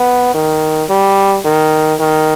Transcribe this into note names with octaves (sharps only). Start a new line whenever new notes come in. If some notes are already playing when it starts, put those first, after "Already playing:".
Already playing: B3
D#3
G3
D#3
D#3